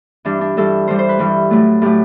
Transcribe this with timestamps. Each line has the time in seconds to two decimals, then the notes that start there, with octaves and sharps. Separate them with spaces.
0.25 G2 E3 G3 D4
0.41 D4
0.57 G2 E3 G3 A4
0.88 G2 E3 G3 C5
0.99 C5
1.09 B4
1.19 G2 E3 G3
1.50 A2 F#3 A3
1.82 A2 F#3 A3 G4